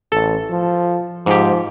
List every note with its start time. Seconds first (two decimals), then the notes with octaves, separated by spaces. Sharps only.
0.12 A1 A4
0.50 F3
1.26 G#2 F3 G4